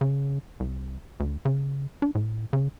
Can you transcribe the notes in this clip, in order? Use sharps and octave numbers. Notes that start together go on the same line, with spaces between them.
C#3
C2
D2
C#3
D4
A2
C#3